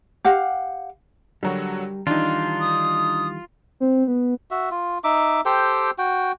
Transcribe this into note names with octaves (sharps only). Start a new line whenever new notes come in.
G4 F5 F#5
D3 F#3 G3 F#4 A#4
D#3 E3 G3 D4 D#4 F4
D#6
C4
B3
F#4 E5
F4
D#4 E5 D6
G4 A4 C5 G5
F#4 G5